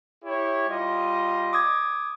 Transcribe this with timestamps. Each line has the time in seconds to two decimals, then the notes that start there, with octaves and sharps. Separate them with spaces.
0.24 E4 G4 C#5
0.69 G3 F4 D#5
1.53 D6 D#6 G#6